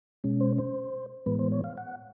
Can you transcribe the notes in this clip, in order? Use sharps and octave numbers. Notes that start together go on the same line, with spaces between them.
B2 G#3 C#4
C5
C5
A2 E3 G#3 B3 B4
C5
C#5
F5
F#5